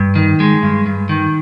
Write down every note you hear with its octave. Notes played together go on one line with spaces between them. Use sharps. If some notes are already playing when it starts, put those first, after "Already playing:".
Already playing: G2
D#3
G#3
G2
G2
D#3